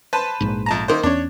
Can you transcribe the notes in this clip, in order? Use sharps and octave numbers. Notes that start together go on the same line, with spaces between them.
B4 C5 A5
A#1 G#2
F2 A5 A#5
D#3 A#3 C5
E2 C#4 D4 C#5